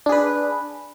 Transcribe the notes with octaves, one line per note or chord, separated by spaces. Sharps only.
D4 G#4 B4